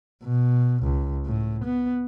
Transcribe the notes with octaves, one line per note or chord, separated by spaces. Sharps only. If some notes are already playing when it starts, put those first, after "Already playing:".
B2
C#2
A2
B3